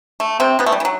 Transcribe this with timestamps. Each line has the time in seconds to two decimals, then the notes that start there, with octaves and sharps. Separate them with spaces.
0.20 A3
0.40 C3 C4
0.59 B2 B3
0.66 A3
0.72 G3
0.80 E3
0.85 F#3